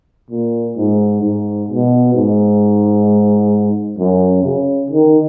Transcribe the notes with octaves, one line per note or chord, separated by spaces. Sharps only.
A#2
G#2
G#2
B2
G#2
F#2
C#3
D#3